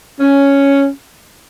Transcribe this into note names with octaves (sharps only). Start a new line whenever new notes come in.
C#4